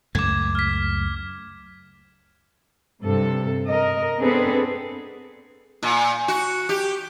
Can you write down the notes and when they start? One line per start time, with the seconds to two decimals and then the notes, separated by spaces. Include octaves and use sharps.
0.15 C#2 F#2 A3 D6 G#6
0.55 F6 B6
3.02 G2 C3 A4
3.67 A#4 D#5
4.19 B3 C4 D4 G#4 A4 B4
5.83 A#2
6.28 F#4
6.69 G4